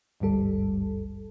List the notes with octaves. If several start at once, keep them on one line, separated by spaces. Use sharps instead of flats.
G#1 D2 G2 G3 A4